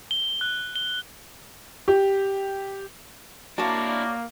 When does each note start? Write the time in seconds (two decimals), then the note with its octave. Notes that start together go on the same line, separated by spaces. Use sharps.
0.11 G7
0.41 F#6
0.76 G7
1.88 G4
3.58 A#3 D4 E4 F#4 C#5 D5 A5